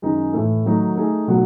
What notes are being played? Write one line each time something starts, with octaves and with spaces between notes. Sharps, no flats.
F#2 D#3 G#3 D#4
A2 E3 A3
D#3 F#3 A3 D#4 F#4
A3 D#4 G#4
B2 F#3 A3 D#4 F#4